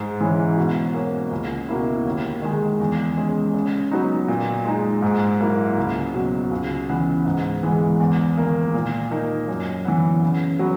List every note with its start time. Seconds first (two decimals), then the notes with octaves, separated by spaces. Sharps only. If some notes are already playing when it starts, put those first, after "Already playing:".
Already playing: G#2
0.21 E3 G#3 C#4 E4
0.57 B2
0.94 A#3 C#4
1.31 C#2
1.68 B2 A#3 E4
2.05 D#2
2.42 D#3 G#3
2.80 E2
3.17 C#3 G#3
3.54 C#3
3.91 F#3 B3 D#4
4.28 A#2
4.65 G#3 D#4
5.02 G#2
5.40 F#3 A#3 E4
5.78 C#2
6.14 B2 F#3
6.51 C#2
6.89 C#3 E3 B3
7.25 G#2
7.63 E3 G#3 B3
8.00 E2
8.37 D#3 A#3
8.74 A#2
9.11 A#3 D#4
9.48 F#2
9.85 E3 B3
10.22 C#3
10.59 F#3 B3